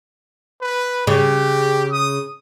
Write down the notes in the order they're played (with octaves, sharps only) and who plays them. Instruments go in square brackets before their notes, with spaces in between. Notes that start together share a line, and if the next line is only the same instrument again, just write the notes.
[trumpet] B4
[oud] C#3 [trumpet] G4
[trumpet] D#6